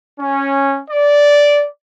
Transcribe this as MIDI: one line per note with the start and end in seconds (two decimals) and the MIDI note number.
0.19 0.81 61
0.90 1.67 74